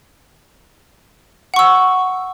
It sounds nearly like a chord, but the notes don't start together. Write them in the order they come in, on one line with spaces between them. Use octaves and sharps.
F#5 C#6 E6